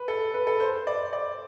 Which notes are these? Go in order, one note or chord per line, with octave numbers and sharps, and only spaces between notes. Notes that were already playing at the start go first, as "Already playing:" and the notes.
Already playing: B4
A4
B4
A4
C5
D5
D5